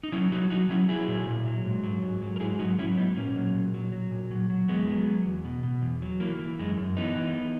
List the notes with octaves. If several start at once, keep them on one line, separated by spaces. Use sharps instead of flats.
D#4
F#3 C#4 E4
F#3 D#4 F#4
F#3 D#4 F#4
F#3 C#4 E4
F#3 E4 G#4
A#2
A#2
F#3
G#2
F#3
G#2
F#3
A#4
G#2 E4 G#4
F#3 D#4 F#4
F#3 C#4 E4
G#2 B3 D#4
A#2 A#3 C#4
F#3
A#2
F#3
F#3
A#2
F#3
F#3
E2 G#3 B3
F#3
F#3
E2
B2
B2
E2
F#3
E3 A#3
E3
F#2 G#3
F#2
E3 B3 D#4
E3